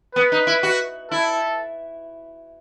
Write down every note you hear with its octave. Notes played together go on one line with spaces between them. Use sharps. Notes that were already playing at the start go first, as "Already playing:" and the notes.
B3 B4
D#4
E4
F#4
E4 A4